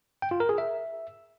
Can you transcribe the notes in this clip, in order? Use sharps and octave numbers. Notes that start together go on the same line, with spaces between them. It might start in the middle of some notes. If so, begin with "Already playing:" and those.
G5
F4
A#4
G#4
E5